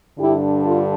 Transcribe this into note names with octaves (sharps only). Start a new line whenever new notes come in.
G2 D3 E4 G4
F4 A4